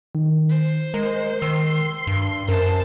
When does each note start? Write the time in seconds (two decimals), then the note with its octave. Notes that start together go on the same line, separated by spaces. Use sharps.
0.15 D#3
0.49 C5
0.94 G#3 A#4
1.42 D#3 C6 E6
2.07 G2
2.48 F#2 A#4 C5 A5